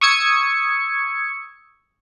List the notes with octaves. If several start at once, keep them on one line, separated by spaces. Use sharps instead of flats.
C#6 D#6 E6 G#6 C#7